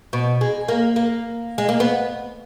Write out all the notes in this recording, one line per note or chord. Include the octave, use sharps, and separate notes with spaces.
B2
G#3
A#3
A#3
G#3
A#3
B3